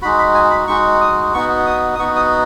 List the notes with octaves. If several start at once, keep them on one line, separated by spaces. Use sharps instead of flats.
G#3 D#4 F#4 B5
B5
G#5
B5
G#3 D#4 F#4 C#6
D#6
B3 D#4 F#4 C#6
D#6
D#6
B3 D#4 F#4 C#6
D#6